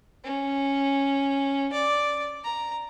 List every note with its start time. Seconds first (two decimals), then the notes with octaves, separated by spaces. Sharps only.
0.24 C#4
1.73 D5
2.44 A#5